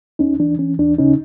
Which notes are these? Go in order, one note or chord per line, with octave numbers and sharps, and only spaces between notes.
D#2 C#4 D#4
E3 D4
E3 C#4
D#2 D4
C#3 C#4 D#4